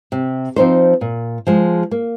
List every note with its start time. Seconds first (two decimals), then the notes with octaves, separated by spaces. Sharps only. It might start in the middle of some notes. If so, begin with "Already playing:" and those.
0.12 C3
0.56 F3 C4 D#4 C5
1.01 A#2
1.47 F3 G#3
1.91 A#3